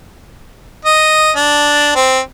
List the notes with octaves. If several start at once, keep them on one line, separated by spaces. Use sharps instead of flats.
D#5
D4
C4